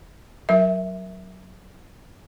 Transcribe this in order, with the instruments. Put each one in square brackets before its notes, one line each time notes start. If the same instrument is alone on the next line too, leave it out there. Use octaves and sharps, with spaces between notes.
[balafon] F#3 A#4 E5